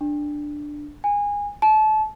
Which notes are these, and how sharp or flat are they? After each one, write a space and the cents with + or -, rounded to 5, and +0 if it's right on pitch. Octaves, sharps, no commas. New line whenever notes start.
D4 +5
G#5 -20
A5 -30